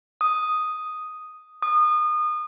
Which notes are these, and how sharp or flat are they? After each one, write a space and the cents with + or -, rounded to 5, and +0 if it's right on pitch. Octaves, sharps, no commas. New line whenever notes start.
D#6 +0
D#6 -30